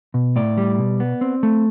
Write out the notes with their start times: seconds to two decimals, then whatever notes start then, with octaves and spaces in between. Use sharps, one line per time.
0.14 B2
0.36 A2 D5
0.58 G3
0.79 B2
1.00 B3
1.21 C4
1.43 A3